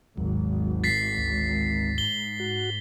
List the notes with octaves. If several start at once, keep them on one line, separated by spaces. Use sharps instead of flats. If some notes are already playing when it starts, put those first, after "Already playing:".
G#1 D#2 F#3
A6 B6 C7
D2
G#2 G7
F#4